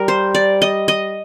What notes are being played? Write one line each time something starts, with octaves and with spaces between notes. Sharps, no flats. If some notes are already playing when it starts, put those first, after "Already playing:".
Already playing: G3 A#4
C5
D5
D#5
D#5